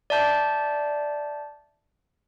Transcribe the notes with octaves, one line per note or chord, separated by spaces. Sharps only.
D5 E5 A5 G6